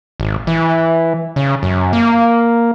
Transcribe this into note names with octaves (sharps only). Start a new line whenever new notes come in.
G#1
E3
C#3
F#2
A#3